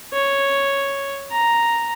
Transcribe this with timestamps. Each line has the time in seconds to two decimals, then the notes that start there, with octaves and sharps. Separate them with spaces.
0.13 C#5
1.32 A#5